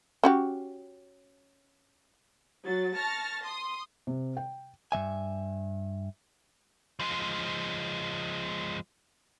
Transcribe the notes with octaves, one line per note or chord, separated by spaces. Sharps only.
C#4 F#4 G4
F#3 A6
A5 C#6 F6 A6 A#6
C6 D#6
C3
G5
G2 E3 E5 G#5
F3 G#3